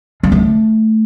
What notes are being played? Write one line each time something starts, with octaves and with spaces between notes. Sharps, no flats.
G#3
A3